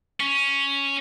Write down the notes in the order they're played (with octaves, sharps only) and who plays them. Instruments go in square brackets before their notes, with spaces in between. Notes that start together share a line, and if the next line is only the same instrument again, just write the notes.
[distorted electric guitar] C#4